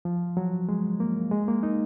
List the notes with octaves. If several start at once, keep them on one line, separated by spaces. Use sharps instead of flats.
F3
F#3
G#3
A#3
G#3
A#3
D#4